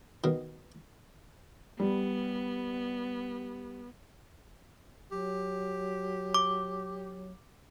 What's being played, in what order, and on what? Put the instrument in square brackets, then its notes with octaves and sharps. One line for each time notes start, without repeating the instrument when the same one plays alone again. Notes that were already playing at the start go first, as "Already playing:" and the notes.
[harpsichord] B2 D#3
[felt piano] G3 [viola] B3
[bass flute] F#3 [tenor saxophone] G4
[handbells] D6